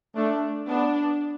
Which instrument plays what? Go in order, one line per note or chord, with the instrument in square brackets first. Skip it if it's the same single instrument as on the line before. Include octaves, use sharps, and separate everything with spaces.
[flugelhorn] A3 [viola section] D4
[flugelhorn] B3 [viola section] D4